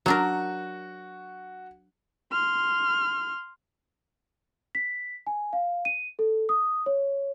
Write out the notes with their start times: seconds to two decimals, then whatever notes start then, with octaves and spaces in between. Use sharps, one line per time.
0.06 F#3 D4 F#4 A#4
2.32 C6 F6
4.75 B6
5.27 G#5
5.53 F5
5.85 D#7
6.19 A4
6.49 D#6
6.86 C#5